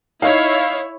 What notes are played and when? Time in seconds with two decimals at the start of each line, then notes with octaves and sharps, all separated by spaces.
0.22 D#4 E4 C#5 F5